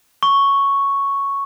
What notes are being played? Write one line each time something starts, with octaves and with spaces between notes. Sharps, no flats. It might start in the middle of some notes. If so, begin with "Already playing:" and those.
C#6